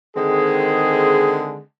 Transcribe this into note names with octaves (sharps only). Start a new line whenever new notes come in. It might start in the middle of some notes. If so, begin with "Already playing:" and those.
D3 D#3 G#3 C4 G#4